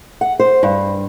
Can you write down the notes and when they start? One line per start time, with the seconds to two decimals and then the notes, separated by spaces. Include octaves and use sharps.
0.21 F#5
0.40 C5
0.63 G2